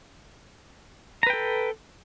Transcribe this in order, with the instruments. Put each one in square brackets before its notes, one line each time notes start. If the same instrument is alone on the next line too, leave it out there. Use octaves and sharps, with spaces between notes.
[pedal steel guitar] A#5
B4
G5
A4